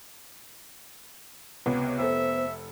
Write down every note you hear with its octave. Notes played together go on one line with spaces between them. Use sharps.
C#2 C3 B3 C#5
F1 A4 C5 E5